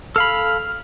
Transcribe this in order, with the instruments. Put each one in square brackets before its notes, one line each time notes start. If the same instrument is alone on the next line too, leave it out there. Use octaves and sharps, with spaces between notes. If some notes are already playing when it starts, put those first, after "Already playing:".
[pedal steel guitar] A4 F5 B5 [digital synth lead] F6